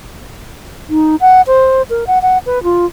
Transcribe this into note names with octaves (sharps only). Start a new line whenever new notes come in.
D#4
F#5
C5
A#4
F#5
F#5
B4
F4